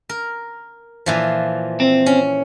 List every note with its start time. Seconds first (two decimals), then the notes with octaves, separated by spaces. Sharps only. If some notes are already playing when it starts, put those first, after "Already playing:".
0.09 A#4
1.06 A#2 E3 F3
1.80 C4
2.06 C#4